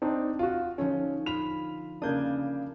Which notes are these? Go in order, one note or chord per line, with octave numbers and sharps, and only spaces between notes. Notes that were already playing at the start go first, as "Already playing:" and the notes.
C4 D4 D#4
F4 F#4
D3 F3 C#4 D#4
F4 B5 F7
C#3 A#3 D4 D#6 G6 G#6